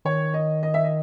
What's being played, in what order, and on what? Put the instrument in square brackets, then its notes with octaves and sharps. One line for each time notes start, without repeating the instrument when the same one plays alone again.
[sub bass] D#3 [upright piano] C#5
[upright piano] D#5
D#5
E5
D#5